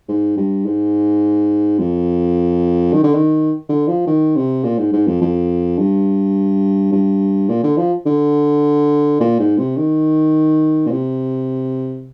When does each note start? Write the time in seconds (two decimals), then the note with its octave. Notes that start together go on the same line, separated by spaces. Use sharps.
0.09 G#2
0.37 G2
0.66 G#2
1.79 F2
2.93 D#3
3.04 D3
3.14 D#3
3.69 D3
3.88 F3
4.07 D#3
4.36 C3
4.64 A#2
4.78 G#2
4.93 G#2
5.07 F2
5.21 F2
5.78 G2
6.92 G2
7.49 A#2
7.64 D3
7.78 F3
8.06 D3
9.20 A#2
9.39 G#2
9.58 C3
9.77 D#3
10.86 A#2
10.91 C3